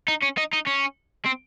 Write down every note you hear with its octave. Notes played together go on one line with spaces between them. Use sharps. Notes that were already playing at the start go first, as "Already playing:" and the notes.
D#4
C#4
D#4
D#4
C#4
C4